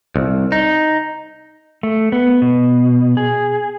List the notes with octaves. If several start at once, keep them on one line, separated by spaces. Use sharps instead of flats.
C2
D#4
A3
B3
B2
G#4